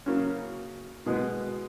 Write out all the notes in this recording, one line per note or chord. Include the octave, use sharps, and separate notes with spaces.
C#3 F#3 A#3 C#4
B2 G#3 B3